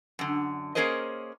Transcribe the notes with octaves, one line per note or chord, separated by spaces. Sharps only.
F#2 D3
A#3 C#4 G#4 A#4 C5 D#5